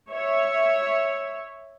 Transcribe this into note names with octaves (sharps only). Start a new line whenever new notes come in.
C#5 E5